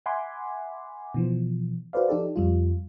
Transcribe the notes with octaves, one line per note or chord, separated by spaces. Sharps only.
E5 F#5 G#5 B5 C6 D6
B2 E3 F3
F#4 A4 B4 C5 D5 F5
F3 D#4 G4 A4 D5
F2 G3 F4